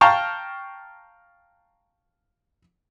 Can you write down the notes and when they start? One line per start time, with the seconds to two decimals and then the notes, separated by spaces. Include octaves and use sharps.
0.01 F5 G5 A5 A#5 C#6 F6